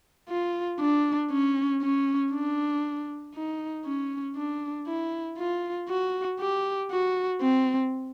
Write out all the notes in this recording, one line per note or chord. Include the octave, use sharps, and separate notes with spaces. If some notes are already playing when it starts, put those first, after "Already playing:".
F4
D4
C#4
C#4
D4
D#4
C#4
D4
E4
F4
F#4
G4
F#4
C4